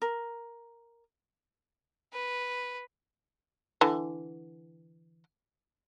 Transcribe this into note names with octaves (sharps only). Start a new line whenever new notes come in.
A#4
B4
D3 E3